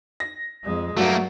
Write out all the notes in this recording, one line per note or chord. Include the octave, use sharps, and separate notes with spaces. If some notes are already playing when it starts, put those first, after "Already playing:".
A#6
F2 G#3
G2 F#3 A3 A#3 F#4